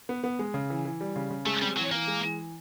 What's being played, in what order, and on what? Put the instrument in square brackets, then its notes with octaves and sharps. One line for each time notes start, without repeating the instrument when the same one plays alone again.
[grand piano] B3
B3
G#3
C#3
E3
E3
G3
C#3
C#3
[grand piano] G#3 [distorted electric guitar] A3
[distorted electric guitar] G3 [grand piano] C4
[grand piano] E3 [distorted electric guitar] F#3
[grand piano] E3 [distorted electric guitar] A#3
[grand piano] G#3
E3